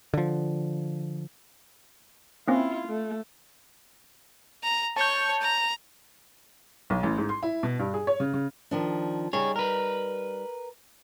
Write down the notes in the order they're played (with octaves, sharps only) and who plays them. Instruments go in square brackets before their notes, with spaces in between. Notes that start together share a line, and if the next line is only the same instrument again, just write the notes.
[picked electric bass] D3 F3
[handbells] A#3 C4 C#4 [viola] E4 F4
[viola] A3
[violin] A#5
[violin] C#5 C#6 [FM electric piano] A5 G6
[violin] A#5
[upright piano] B1
A1
G#2
C6
E4
B2
G2
G#4
C#5
C#3
C#3
[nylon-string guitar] D#3 F3 D4
[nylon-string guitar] G3 D#4 [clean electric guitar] G#4 C#5
[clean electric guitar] A#4 B4